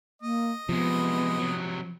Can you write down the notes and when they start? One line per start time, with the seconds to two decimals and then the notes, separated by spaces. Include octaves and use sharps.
0.22 A#3 D#5
0.69 C3 F3 G#3 B3
1.38 C3 F#3